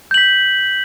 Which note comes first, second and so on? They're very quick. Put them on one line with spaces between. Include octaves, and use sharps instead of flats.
G6 F#7 B6